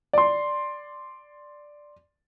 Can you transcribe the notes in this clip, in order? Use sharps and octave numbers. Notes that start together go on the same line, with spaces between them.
D5 C6